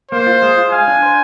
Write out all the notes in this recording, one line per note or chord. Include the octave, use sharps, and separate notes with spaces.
A#3 C5
F4
G#3
F4
F5 G#5
D4
C5